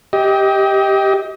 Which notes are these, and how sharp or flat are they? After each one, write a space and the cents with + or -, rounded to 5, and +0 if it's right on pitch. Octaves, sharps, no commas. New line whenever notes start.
G4 +0 D#5 +30